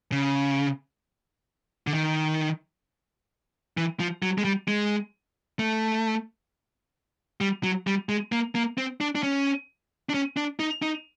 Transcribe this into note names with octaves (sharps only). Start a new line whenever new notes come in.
C#3
D3
D#3
E3
F3
F#3
G#3
G3
G#3
A3
G3
F#3
G3
G#3
A#3
A#3
C4
D4
D4
C#4
D4
C#4
D4
D#4
D#4